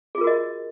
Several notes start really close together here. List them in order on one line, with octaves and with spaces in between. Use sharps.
G#4 F4 A#4 F#4 D#5